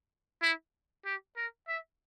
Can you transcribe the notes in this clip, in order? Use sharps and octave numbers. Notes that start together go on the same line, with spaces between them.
E4
G4
A#4
E5